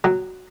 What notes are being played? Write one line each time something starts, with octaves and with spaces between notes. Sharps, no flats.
F#3